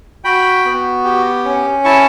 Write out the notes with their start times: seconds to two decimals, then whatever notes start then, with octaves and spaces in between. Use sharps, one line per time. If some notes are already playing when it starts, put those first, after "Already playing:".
0.24 F#4 G5 B5
0.65 B3
1.05 G4
1.45 C#4
1.84 E4 A5 C#6